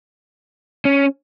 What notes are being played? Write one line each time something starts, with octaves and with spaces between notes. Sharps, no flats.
C#4